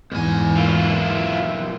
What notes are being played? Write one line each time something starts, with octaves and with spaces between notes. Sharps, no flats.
E2 G#2 B2 G#5
B1 A#3 E4 F4